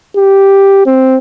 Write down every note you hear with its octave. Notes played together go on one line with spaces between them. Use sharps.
G4
C4